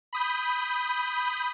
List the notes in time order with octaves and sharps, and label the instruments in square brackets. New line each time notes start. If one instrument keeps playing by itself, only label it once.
[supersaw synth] B5 D#6 G6